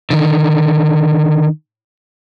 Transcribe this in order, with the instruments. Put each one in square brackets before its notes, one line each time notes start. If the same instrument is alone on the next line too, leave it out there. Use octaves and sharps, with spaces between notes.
[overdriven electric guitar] D3 D#3